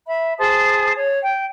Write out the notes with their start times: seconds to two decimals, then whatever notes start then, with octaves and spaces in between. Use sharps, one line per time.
0.07 E5 B5
0.39 G#4 C5 A5 D#6
0.96 C#5
1.22 G5